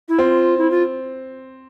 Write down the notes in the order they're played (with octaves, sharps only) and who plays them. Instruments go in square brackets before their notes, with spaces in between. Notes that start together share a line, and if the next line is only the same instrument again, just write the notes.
[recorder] E4
[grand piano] C4 [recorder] F4
[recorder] E4
F4